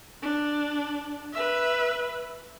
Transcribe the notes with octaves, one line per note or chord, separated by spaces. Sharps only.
D4
B4 E5